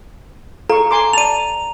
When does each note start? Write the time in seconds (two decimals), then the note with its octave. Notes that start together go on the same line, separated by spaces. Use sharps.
0.70 A4 F5 A#5 C#6
0.91 G#5 C6 D6
1.13 D5 A5 D#7 F7